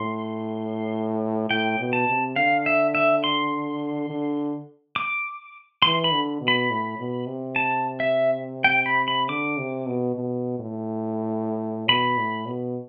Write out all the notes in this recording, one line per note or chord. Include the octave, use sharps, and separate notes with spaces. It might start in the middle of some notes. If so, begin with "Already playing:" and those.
Already playing: A2 C6
A2 G5
B2
A5
C3
D3 F5
E5
E5
C6
D3
D6
E3 C6
B5
D3
B2
B5
A2
B2
C3
A5
E5
G5
B5
B5
D3 D6
C3
B2
B2
A2
B2 B5
A2
B2